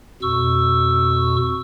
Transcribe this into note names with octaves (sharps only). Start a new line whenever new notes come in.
F2 B2 C#6 E6